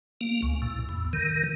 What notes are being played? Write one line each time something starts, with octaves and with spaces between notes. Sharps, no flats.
A#3
C#2
A2
E2
D#3